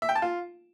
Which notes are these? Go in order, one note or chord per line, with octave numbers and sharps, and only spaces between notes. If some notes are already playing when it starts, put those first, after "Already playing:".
E5
G5
A5
F4